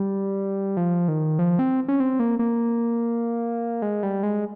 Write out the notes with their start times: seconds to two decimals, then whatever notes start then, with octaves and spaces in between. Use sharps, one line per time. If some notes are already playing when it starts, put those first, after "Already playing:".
Already playing: G3
0.77 F3
1.08 D#3
1.39 F3
1.59 C4
1.88 C#4
2.00 C4
2.19 A#3
2.39 A#3
3.82 G#3
4.03 G3
4.23 G#3